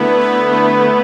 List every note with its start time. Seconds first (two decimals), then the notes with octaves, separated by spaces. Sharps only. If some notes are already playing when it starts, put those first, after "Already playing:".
Already playing: D3 A3 B3 E4 B4
0.21 B4
0.52 A3
0.82 E4